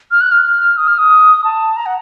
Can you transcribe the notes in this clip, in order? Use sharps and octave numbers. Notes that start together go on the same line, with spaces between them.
F6
F#6
F6
D#6
F6
D#6
A5
A#5
F#5